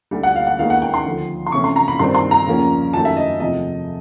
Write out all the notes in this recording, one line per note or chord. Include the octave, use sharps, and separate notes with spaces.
D2 D3 G3
F#5
F5
F#5
D#2 D#3 G#3 B3 F5
F#5
G5
C6
D2 D3 F3
C6
C3 E3 A3 C#4 C#6
C6
A#5
B5
G2 D#3 G3 C4 C6
C6
A#5
E2 C#3 F3 A#3 C#4
F#2 D#3 F#3 A3 A5
E5
D#5
E2 C3 F3 A3 D#5